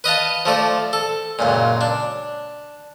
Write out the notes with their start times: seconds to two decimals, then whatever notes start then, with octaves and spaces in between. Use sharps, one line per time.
0.04 B4 D#5 F5 A5
0.45 F3 A3 D5
0.93 A4
1.39 C#2 F#2 A#2
1.81 D4